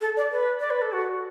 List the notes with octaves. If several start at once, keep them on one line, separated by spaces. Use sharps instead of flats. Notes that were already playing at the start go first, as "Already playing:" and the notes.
A4
D5
B4
D5
B4
A4
F#4